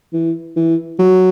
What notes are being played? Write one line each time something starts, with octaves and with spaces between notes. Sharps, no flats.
E3
E3
F#3